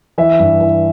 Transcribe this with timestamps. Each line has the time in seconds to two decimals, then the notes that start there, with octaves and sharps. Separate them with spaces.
0.18 E3 E5
0.39 G2
0.61 E3